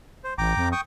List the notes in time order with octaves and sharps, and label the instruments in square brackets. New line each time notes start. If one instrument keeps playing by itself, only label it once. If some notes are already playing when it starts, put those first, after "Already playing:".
[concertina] C5
[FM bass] A1 [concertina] G5 A#5 D6
[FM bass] F2
[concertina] G5 C#6 D#6